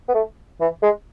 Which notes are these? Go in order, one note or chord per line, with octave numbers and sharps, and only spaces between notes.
B3
A3
E3
G#3